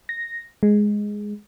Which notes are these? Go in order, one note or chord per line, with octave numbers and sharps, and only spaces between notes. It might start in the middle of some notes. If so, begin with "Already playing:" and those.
A#6
G#3